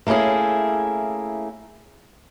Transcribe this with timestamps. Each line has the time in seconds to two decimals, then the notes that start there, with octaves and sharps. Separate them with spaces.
0.07 A3 A#3 C#4 E4 G#4